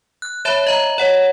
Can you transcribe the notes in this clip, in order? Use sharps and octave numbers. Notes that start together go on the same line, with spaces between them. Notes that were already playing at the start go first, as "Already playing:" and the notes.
F#6
C#5 E5 A5 B5
D#5 A#5
C#5 F#5